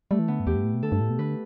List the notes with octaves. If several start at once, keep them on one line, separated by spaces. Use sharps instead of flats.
G3 A3
E3
D3 B3
G2
E2 G4
G2
A2
B2
D3 A4
G2
A2
B2
D3 B4